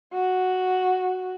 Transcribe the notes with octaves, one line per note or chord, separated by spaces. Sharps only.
F#4